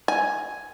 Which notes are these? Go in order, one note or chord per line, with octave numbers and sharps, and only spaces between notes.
G#5